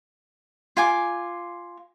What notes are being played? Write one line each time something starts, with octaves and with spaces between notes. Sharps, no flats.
F4 G#5 D6